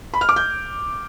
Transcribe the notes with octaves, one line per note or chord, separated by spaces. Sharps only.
B5
F6
D6
G6